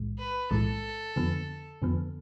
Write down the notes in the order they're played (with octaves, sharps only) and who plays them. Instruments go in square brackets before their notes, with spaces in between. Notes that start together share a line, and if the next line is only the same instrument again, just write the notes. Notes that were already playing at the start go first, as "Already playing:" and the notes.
Already playing: [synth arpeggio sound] B1 A2 E3 G#3
[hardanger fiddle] B4
[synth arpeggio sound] B1 A2 E3 G#3 [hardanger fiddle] A4
[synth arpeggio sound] F2 D3 F3 B3
F2 D3 F3 B3